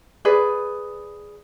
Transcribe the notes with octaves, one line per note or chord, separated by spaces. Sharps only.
G#4 B4 D5